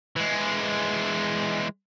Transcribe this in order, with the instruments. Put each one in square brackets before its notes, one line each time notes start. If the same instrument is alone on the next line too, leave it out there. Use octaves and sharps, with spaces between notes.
[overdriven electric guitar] E3 G#3